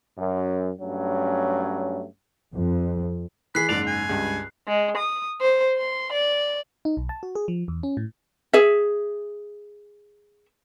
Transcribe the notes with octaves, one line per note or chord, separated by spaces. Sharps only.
F#2
G2 F#3 A3 C#4
F2
E3 G#4 B5 F#6 C7
F#1 G#2 D5 F7
G#5
C#2 G2
G#3
D#6
C5
C6
D5
D#4
B1
A5
F#4
G#4
F3
E2
C#4
A2
G#4 E5